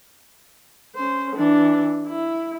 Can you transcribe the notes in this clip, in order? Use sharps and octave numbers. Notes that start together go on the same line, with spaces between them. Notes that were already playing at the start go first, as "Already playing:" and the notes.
C#4 C5
E3 D4
E4